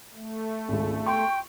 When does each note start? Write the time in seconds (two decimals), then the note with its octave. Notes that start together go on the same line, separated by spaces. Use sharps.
0.14 A3
0.68 G#1 C#2
1.06 G5 C6 C#6